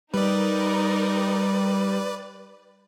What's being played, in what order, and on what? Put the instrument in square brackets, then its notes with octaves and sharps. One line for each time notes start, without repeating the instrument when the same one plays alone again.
[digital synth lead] G3 [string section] D#4 A#4 [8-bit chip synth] B4 D5